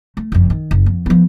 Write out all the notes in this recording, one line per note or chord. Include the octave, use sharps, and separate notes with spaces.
A3
F#1 F2
D#3
F#1
F2
F3 B3